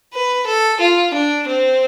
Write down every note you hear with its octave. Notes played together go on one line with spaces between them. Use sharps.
B4
A4
F4
D4
C4